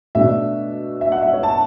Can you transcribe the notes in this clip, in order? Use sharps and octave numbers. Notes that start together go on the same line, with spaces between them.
B2 A3 D4 E5
E5
F#5
E5
C#5
A5